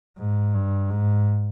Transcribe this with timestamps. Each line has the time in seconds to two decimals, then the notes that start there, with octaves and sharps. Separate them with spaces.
0.18 G#2
0.54 G2
0.90 G#2